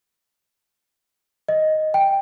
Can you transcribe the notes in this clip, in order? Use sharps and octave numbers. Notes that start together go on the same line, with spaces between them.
D#5
G5